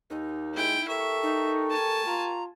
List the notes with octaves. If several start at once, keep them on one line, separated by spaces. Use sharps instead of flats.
D#2 D#4
G#3 E4 G5
G4 A4 A#4 E5 C#6
D#4
G#5 A5
F4 A#5